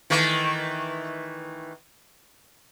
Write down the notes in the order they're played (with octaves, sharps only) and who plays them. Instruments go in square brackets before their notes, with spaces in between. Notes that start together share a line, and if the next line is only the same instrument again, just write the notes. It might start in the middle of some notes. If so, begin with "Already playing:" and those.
[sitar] D#3 E3 A3